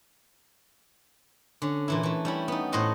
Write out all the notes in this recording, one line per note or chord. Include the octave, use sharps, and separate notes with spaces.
D3 C#4
A#2 E3 E4
E3 A3
G3 C#4 E4
B3 D#4
A2 F#4 C5 D#5 F#5